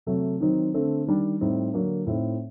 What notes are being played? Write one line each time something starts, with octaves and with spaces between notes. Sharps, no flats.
C3 F#3 A3
D#3 F#3 C4 D#4
D3 A3 C4
D#3 G3 D4
A2 G3 C4 D#4
D3 F#3 A#3 D4
A2 A3 C4 D#4